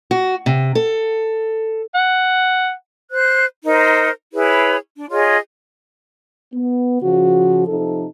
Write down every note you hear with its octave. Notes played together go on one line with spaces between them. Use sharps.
F#4
C3
A4
F#5
C5 F#6
D#4 A#4 C5
E4 G#4 B4 C#5
D4
F4 G#4 C#5 D#5
B3
C#3 F3 F#4
C3 F3 D#4 A4